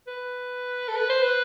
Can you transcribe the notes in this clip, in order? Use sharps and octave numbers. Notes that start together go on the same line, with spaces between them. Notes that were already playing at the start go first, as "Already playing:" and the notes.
B4
A4
B4
C5
B4